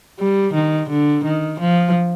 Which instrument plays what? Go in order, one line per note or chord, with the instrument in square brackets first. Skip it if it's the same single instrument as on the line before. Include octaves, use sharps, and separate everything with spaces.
[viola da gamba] G3
D#3
D3
D#3
F3